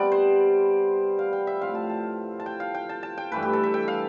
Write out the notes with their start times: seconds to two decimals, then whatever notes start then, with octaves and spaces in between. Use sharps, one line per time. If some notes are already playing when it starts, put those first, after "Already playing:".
Already playing: C3 G3 B3 D5
0.12 C5
1.19 F5
1.33 G5
1.47 E5
1.61 A2 F3 C4 F5
1.75 A5
1.89 A5
2.40 A5
2.46 G5
2.60 F5
2.74 G5
2.89 A5
3.03 A5
3.18 G5
3.32 G2 E3 A3 B4
3.43 G4
3.53 A4
3.63 E5
3.74 G5
3.88 F5